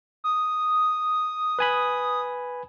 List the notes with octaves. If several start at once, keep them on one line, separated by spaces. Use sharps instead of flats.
D#6
B4 G#5 B5